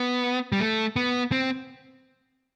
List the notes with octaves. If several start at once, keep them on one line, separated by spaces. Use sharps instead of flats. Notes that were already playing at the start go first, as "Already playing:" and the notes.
Already playing: B3
G3
A3
B3
C4